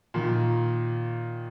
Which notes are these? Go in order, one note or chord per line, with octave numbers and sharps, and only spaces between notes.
A#2 D#3